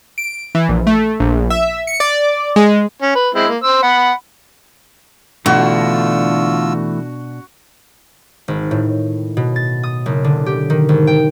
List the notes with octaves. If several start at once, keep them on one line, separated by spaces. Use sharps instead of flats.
D7
E3
A#1
A3
A#1
E5
C#7
D5
G#3
C#4
B4
G#3 C4 E4
A#3
C5 E6
F#5 B5
B2 D3 E3 A3 D4 F4 F#4 E6
G#1
A2
B2
A6
D#6
F#1
D3
G4
D#3
G#1
G5